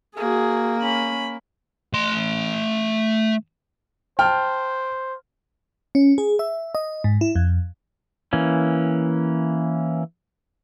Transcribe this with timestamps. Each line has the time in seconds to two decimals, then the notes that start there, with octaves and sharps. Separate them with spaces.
0.17 A#3 F#4 G#4
0.80 C#4 B5
1.94 A3 C6
4.19 C5 G5 A5 F6
5.95 C#4
6.18 G#4
6.39 E5
6.75 D#5
7.04 G#2
7.21 E4
7.35 F2
8.33 E3 A#3 C#4